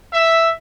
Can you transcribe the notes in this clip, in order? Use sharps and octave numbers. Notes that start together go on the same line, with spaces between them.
E5